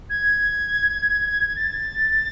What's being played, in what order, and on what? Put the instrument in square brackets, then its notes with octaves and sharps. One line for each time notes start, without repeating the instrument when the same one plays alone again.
[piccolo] G#6
A6